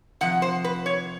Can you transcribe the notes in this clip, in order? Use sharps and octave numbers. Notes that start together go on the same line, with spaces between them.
C3 F3 F#5
C5
B4
C#5